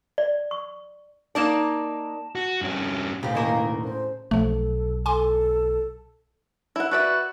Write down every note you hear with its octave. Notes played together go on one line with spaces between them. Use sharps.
D5
C#6
A#3 D#4 D5 A5 E7
F#4
G2 C#4
E1 A2 C#3 G4 F5
D#3 A#3 A#4
C5
B1 F3 A3 A4
A4 G#5 C6 D6
E4 F#5
F#4 B4 D5 E5